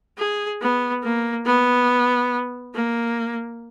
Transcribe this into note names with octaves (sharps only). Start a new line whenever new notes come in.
G#4
B3
A#3
B3
A#3